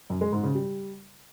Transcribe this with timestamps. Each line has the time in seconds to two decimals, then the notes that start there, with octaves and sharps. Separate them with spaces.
0.10 F#2
0.21 G#3
0.32 G#2
0.43 C#3
0.55 G3